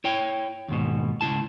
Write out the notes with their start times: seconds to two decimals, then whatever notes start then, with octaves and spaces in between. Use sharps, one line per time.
0.04 E4 C#5 G5
0.68 D#2 G#2 B2
1.21 C#2 G#3 E4 A5